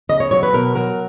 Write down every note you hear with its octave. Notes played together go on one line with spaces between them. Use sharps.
C#3 D#5
C#5
F#3 C#5
B4
B2 A#4
F#3 A#4